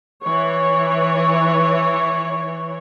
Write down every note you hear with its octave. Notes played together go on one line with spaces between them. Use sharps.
E3 C#5